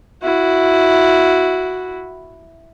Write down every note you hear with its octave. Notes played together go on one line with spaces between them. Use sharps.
E4 F#4